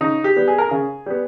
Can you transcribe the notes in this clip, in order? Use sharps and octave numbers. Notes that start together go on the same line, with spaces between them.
C#3 D#4
G4
G3 B3
G#4
A#4
C#3 G#4
G3 B3